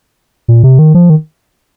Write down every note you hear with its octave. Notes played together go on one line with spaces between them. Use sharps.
A#2
C3
D#3
F3
D#3